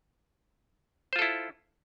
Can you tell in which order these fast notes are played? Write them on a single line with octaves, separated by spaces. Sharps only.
C5 F4 A4 E4